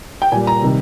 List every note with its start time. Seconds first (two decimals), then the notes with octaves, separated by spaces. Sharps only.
0.22 G5
0.32 A#2 G3 G#5
0.47 A#5
0.62 C3 D#3 G3